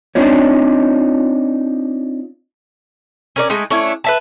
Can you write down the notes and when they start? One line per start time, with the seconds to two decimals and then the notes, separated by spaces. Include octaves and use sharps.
0.15 C4 D4 D#4 F4 C#5
3.36 C#4 A#4 D5
3.50 G#3 A3 D#4
3.70 A3 C#4 D4 E4
4.04 B4 E5 A5